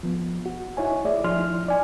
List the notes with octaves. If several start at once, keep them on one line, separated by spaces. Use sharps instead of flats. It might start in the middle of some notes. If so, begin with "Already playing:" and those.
F3 B3
F#4
D#4 E4 C#5 G#5
A3 G#4 D5 E5
F3 D#4 E4 C6 F6
D#4 D5 G#5